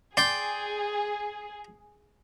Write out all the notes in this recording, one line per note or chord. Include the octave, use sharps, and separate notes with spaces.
G#4 D5 G5 C6